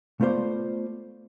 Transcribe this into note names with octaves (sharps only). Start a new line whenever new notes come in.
A3 B3 F4 C5 D5